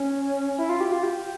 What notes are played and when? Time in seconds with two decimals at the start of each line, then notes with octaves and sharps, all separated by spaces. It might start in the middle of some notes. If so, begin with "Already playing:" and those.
Already playing: C#4
0.58 E4
0.69 F4
0.81 G4
0.92 F4
1.03 G4